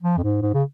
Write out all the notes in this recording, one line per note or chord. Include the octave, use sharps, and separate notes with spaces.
F3
F2
G#2
G#2
C#3